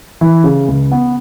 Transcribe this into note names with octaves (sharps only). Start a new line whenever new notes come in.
E3
C#3
C#2
B3